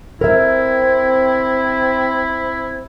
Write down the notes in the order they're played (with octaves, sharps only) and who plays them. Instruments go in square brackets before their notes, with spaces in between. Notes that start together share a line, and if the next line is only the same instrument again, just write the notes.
[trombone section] C4 [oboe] E4 [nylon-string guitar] A#4 E5